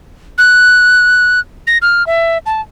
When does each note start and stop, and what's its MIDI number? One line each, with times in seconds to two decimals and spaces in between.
0.38 1.40 90
1.67 1.78 94
1.82 2.06 89
2.07 2.38 76
2.46 2.61 81